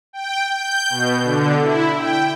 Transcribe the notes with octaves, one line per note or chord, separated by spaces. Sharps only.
G5
G6
B2
D3
E4
G5